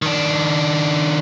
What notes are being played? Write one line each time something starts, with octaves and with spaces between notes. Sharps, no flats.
D#3 D4